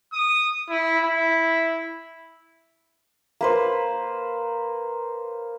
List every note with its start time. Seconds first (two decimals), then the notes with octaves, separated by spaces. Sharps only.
0.13 D#6
0.70 E4
1.04 E4
3.41 A#3 B4 C5